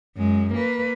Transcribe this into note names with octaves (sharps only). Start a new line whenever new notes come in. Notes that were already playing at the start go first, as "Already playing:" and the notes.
F#2 G#3
A#3 B4